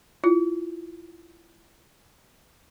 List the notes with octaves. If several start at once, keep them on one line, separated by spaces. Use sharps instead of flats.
E4 F4